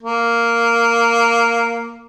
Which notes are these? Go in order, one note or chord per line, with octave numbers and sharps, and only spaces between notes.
A#3